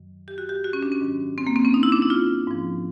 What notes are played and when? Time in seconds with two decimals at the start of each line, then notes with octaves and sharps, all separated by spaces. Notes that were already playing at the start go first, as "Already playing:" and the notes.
Already playing: F#2 D#3 F#3
0.28 G4
0.38 F#4
0.49 G4
0.64 F#4
0.73 C#4
0.83 D4
0.92 C#4
1.01 G#2 D#3 F#3
1.38 C4
1.47 A#3
1.56 C4
1.65 C#4
1.74 D#4
1.83 E4
1.92 D4
2.02 E4
2.10 F4
2.47 G#2 F3